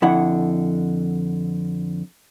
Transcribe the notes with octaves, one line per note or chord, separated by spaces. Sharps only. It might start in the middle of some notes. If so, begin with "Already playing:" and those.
F2 D3 E4 F#5